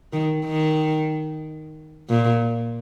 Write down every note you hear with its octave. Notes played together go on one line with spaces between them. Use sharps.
D#3
D#3
A#2